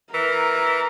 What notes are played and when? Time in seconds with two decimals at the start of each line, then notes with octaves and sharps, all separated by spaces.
0.14 E3 A#4